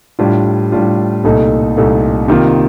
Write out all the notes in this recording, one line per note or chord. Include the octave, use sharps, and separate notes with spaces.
A2 G3 D4 F4
A2 G3 D4 F4
C2 A#2 A3 D#4 A4
C2 A#2 A3 D#4 A4
C3 D#3 A#3 F4